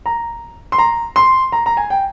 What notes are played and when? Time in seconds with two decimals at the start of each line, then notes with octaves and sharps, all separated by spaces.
0.06 A#5
0.72 C6
0.78 A#5
1.16 C6
1.52 A#5
1.66 A#5
1.77 G#5
1.90 G5